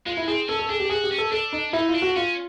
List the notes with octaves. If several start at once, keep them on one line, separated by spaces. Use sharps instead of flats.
G#3 F4
E4
C4 G#4
C#4 A4
A4
D4 G#4
G4
F#4 G#4
G4
C#4
A4
D4 A4
D#4
D#4 E4
F4
D4
F#4
C#4 F4